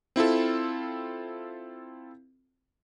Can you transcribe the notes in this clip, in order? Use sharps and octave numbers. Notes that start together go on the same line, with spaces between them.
C4 E4 F4 A4